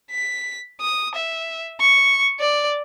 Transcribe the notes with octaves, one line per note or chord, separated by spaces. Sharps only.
B6
D#6
E5
C#6
D5